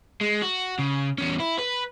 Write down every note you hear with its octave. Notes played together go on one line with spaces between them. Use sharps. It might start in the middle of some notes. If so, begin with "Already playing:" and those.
G#3
F#4
C#3
E2 C#4
E4
B4